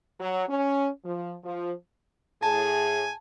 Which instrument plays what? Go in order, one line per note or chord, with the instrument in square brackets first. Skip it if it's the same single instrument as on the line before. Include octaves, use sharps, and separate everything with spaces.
[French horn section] F#3
C#4
F3
F3
[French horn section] A2 G#4 [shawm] G#5 [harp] A5